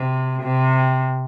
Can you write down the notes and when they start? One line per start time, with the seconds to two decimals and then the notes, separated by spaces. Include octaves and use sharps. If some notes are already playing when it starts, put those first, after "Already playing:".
Already playing: C3
0.42 C3